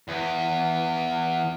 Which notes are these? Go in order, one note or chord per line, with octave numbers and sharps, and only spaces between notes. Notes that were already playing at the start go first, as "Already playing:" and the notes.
E2 B3